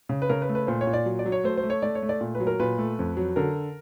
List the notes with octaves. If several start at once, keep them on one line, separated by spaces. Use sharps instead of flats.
C#3
B4
C#3 A#4
B4
A3
B4
A#2 C5
C#5
A#2
D5
F#3
D5
F#3
C#5
A3 C5
C5
A3
C#5
A3 D5
C#5
A3
D5
A#2
B4
F#3
A#4
A#2 B4
A3
F2
F#3
D3 A#4